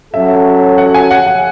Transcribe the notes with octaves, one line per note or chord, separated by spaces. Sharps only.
F#3 C#4 F#4 A4 E5
F#5
G#5
F#5
F#5